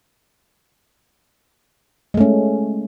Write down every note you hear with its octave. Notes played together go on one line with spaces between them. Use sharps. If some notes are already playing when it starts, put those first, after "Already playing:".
G#3 A3 C#4